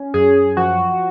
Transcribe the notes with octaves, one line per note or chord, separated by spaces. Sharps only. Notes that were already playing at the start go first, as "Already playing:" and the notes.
Already playing: C#4
F#2 G#4
F3 F#4